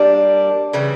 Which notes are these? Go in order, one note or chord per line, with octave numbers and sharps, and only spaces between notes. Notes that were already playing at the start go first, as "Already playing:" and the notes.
Already playing: G3 A#3 D4
C#3 E3 G3